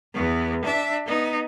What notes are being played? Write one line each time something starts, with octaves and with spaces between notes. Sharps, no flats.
E2 B3
D4 E5
B3 D#4